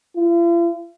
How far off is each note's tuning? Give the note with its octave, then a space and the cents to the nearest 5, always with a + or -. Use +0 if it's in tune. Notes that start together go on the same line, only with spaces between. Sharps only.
F4 -45